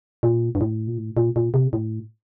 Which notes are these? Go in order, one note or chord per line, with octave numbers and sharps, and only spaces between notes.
A#2
G2
A2
A#2
A2
A#2
A#2
C3
A2